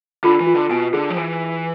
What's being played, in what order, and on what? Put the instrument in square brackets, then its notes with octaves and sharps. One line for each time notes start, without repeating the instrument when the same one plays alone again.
[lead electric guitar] D3 [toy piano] F4
[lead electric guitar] E3
[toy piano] F4
[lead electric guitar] D3
[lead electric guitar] B2 [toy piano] G#5
[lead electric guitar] D3 [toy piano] G#4
[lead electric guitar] F3
[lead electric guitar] E3 [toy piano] G#5